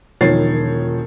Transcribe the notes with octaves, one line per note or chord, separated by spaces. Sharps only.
E1 D#3 F3 C#5 A6 C7